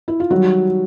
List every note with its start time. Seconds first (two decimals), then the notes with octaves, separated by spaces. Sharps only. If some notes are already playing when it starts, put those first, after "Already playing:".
0.08 E4
0.20 F4
0.30 D#3 F#3 G3 F#4